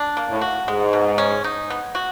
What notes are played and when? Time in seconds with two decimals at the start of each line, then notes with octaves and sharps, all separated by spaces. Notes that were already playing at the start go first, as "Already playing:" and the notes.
Already playing: D4
0.17 A#3
0.29 A2
0.41 F#4
0.67 G#2 G#3
0.93 B2
1.18 C#4
1.44 D#4
1.70 B3
1.95 F#4